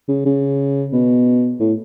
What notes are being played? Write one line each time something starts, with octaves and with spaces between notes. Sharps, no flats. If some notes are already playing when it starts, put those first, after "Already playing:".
C#3
C#3
B2
A2